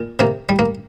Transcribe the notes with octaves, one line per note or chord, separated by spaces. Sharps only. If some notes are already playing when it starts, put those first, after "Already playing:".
Already playing: A#2
C3 A#3
G3
A#3